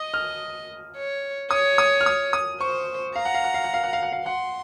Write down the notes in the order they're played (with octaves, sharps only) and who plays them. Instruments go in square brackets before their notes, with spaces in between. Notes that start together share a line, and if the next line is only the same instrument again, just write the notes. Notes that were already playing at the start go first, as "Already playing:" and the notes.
Already playing: [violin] D#5 [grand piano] D#6
[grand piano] F6
[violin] C#5
[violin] C#5 [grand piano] D#6
[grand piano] D#6
F6
D#6
D#6
[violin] C5 [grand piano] C#6
[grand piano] F5 [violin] A#5
[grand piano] F#5
F5
F#5
F5
F#5
F5
F#5
F5
F#5
F5
[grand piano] F#5 [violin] C6